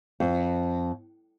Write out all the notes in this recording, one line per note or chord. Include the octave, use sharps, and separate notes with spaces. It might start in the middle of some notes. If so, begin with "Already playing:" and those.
F2